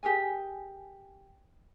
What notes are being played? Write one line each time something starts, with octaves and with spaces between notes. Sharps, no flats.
G4 G#4 A#4 G#5